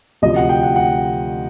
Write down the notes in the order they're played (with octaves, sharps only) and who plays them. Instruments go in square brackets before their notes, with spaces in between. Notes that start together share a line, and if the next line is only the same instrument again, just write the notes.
[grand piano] D2 C3 F3 D#5
F#5
G5
F#5
F#5